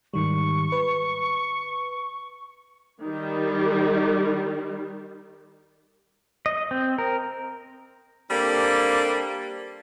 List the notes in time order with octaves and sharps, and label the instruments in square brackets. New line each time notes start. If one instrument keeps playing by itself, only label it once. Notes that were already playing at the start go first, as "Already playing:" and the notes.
[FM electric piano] G#2 D#3 G3 [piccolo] C#6
[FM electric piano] B4
[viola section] D#3 G3
[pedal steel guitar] D#5
C4
A#4
[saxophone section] G3 A#3 C4 D4 A4